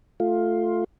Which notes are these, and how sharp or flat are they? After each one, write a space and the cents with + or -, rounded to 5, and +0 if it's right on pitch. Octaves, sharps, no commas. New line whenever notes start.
A3 +0 F4 +10